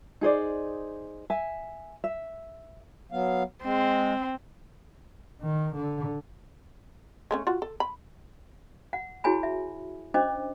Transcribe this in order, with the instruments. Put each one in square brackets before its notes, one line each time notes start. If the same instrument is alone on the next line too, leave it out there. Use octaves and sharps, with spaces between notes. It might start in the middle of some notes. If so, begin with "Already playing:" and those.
[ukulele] D#4 G#4 C5 D5
E5 G#5
E5
[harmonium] F#3 B3 F5
[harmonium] G#3 [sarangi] C4
[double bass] D#3
D3
[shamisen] G#3 A3 C#4
F4 F#4
A4
B5
[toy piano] F#5
E4 F#4 G#4 C#5 G#5 B5
E5
C#4 D4 C5 D#5 D6